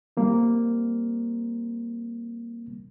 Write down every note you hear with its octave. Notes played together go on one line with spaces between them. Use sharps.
G3 A#3 C4